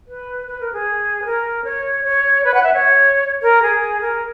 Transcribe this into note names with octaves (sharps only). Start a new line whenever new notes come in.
B4
B4
A#4
G#4
B4
A#4
C#5
C#5
B4
F#5
E5
C#5
A#4
G#4
A#4